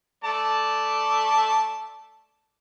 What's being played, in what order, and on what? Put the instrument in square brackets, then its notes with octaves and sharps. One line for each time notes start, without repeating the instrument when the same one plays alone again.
[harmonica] A3 D5 A5